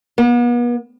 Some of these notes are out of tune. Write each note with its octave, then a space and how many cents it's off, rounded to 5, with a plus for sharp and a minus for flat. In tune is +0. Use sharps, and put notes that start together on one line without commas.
B3 -40